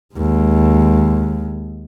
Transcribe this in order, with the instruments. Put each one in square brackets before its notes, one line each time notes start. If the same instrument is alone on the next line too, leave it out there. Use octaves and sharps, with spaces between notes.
[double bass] D#2 G#3